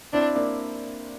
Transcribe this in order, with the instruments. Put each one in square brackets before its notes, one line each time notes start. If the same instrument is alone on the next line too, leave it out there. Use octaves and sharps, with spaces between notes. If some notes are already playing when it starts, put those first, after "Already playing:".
[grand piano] C4 E4 [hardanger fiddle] D4
[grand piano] A#3 D4